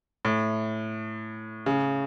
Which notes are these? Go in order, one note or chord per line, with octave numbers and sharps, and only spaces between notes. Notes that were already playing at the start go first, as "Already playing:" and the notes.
A2
C#3